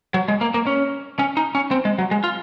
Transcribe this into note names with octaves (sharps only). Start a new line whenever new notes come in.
F#3
G#3
A#3
A#3
C#4
C#4
D#4
C#4
C4
G#3
F#3
G#3
F4